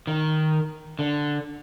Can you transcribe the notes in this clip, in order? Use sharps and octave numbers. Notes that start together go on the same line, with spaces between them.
D#3
D3